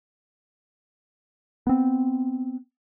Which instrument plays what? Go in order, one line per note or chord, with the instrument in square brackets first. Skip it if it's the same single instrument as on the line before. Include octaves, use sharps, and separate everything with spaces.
[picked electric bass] B3 C4